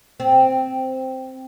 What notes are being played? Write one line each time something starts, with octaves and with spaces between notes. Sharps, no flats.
C4